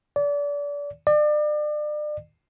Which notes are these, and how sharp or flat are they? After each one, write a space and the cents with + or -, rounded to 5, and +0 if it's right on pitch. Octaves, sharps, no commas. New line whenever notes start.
D5 -30
D5 +35